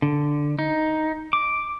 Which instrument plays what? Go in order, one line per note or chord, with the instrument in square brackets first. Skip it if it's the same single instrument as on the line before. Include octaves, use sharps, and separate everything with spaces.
[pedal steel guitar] D3
D#4
D6